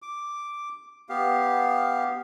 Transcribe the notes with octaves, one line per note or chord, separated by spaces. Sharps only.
D6
B3 G4 F5